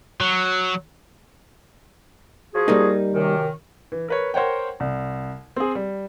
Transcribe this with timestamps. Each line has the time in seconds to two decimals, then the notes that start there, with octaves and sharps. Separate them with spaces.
0.20 F#3
2.55 F3 F#4 G#4
2.68 G3 A#3 D#4
3.14 F#2 C3 D#3
3.92 E3
4.08 A#4 B4 C#5
4.34 A#4 C5 C#5 F#5 G5
4.80 C2
5.56 C4 G#4
5.75 G3